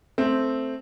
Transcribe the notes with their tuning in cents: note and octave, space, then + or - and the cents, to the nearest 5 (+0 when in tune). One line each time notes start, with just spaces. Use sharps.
A3 +0 C4 +0